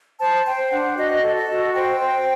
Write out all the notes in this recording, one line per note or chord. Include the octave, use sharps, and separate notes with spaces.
C5 A5
C5 G5
D4 F#5
F#4 D#5
A4
D#5
F#4
C5 G5
C5